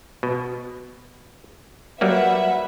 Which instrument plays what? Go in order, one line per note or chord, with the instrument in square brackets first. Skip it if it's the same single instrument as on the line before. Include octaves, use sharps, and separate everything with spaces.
[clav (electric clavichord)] B2
[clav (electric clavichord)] F#3 G3 A#3 [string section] B4 E5 F#5